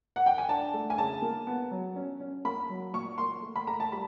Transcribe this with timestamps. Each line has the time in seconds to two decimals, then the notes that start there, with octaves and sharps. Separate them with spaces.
0.16 F#5
0.26 G5
0.38 G#5
0.49 D4 A5
0.74 A3
0.90 G#5
0.98 C#3 A5
1.22 A#3
1.47 B3
1.71 F#3
1.96 C#4
2.20 C#4
2.45 A#3 B5
2.69 F#3
2.93 A#2 C#6
3.18 A#2 C6
3.42 A3
3.56 B5
3.67 A3 A#5
3.80 A5
3.92 G3 B5